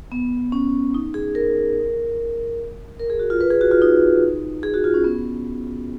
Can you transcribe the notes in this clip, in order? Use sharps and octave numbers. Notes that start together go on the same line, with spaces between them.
B3
C#4
D#4
G#4
A#4
A#4
G#4
F#4
F4
B4
G#4
F#4
F4
D#4
G#4
F#4
F4
C#4
B3